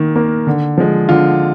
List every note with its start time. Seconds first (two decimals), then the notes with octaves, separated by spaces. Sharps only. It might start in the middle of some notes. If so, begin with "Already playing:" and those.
Already playing: D#3 A#3
0.16 A#3
0.47 D3
0.77 F3 G#3
1.09 D3 F4